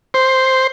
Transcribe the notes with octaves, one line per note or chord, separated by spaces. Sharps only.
C5